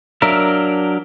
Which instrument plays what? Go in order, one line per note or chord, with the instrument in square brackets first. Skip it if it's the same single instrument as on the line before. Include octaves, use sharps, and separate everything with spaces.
[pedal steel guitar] F#3 D4 A#4 E5 F5